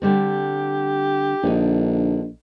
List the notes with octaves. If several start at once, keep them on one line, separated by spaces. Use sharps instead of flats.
D3 G3 C4 G4
A#1 D3 D#4